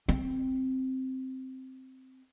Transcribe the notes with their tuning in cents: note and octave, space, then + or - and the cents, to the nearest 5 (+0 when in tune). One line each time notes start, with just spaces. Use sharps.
C4 +0